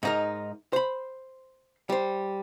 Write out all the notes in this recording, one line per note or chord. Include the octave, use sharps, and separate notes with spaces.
G#2 D#4 A#4
C5 B5
G3 C5